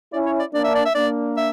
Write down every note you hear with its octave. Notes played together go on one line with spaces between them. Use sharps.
C#4 E4 D5
C#5
D5
A#3 D4 D5
E5
D5
E5
A#3 D4 D5
E5